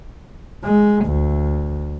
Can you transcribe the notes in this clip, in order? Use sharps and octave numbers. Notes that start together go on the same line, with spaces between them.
G#3
D2